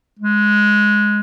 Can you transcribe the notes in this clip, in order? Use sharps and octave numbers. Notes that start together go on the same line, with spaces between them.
G#3